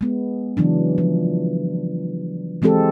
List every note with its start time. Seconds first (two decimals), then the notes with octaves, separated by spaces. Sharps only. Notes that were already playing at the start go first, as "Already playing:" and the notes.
0.01 G#3 B3
0.57 C#3 E3 F#3 D4
0.98 F3
2.62 E3 G#3 C4 G4 A4